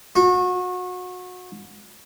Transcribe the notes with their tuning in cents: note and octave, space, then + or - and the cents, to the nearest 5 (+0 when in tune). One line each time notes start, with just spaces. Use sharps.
F#4 -30